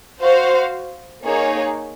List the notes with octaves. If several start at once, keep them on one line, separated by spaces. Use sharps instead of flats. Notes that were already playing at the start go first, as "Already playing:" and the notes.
F#4 C5 F5
A#3 D#4 G#4 C#5